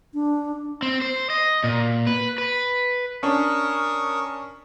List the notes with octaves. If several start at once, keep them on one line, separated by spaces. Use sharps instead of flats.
D4
C4
C5
D#5
A#2
B4
B4
C#4 D4 A#4 C#6 D#6